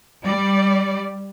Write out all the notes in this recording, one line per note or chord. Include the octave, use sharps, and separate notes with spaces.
G3 D5